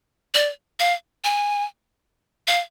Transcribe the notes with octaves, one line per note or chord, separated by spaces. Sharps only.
D5
F5
G#5
F5